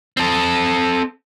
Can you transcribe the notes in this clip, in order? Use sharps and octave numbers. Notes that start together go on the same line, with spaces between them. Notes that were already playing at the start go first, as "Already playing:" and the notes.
C4 A4